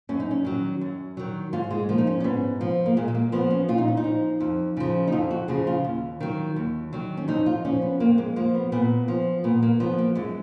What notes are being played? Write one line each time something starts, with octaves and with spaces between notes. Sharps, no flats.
F#2 C#4
D#4
C#4
D#3 F#3
F#2
D#3 F#3
G#2 F4
G#3
F3 A#3
D#4
C#4
C#4
G#2 B3
F3
A#3
A#2 G#3
G#3
A#3
F3 B3
C#4
A#2 F4
D#4
C#4
D#4
F3
F2
C#3 F3
D#4
F2 F4
F#4
C#3 F3 G#4
F4
D#2
D#3 F#3
D#2
D#3 F#3
C#4
F2 D#4
F4
F3 C#4
B3
F2 A#3
G#3
F3 A#3
B3
A#2 B3
F3
A#2 B3
A#3
F3 B3
A#3
F#2 G#3